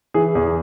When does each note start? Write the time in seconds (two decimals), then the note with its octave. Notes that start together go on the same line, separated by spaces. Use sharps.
0.14 E3 G#4
0.35 E2 G#4